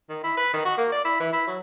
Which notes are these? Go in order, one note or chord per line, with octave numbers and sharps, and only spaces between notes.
D#3
E4
B4
D#3
F#4
A#3
D5
E4
E3
E4
F#3